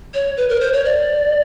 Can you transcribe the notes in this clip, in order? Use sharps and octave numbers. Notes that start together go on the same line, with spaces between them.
C#5
B4
A#4
C5
C#5
D5